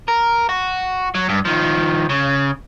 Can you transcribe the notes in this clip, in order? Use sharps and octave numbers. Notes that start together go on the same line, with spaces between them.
A#4
F#4
F#3
G2
D#3 F3
C#3